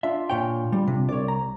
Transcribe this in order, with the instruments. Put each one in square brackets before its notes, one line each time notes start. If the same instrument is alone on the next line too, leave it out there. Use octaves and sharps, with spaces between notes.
[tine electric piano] D4 F4 [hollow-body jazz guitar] E5
[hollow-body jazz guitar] A#2 C#5 G5
G3
C3
[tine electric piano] C2 [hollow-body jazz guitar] C#5 D5
[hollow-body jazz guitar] A#5